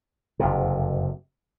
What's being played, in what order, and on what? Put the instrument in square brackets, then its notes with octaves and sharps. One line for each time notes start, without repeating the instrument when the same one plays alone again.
[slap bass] F#1 F2 C3